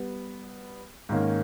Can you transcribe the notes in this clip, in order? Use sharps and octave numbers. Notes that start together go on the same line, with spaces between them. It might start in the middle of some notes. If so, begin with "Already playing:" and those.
Already playing: G3 B3
G#2 D#3 A#3 C#4